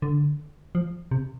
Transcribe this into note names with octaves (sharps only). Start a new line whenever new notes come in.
D3
F3
C3